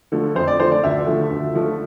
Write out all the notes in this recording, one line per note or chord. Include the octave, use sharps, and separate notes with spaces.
D3 F3 A3
F2 C5
D5
D3 F3 A3 C5
D5
D2 E5
D3 F3 A3
D2
D3 F3 A3